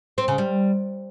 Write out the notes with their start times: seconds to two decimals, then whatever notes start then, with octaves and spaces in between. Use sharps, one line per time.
0.18 C4
0.28 C#3
0.38 G3